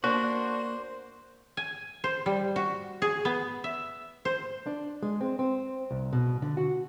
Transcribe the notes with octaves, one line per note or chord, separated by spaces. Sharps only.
A#3 D4 F#4 C5
G#5
C5
G3
F#4
G#4
B3
E5
C5
D4
G#3
C4
C4
C2
B2
D3
F#4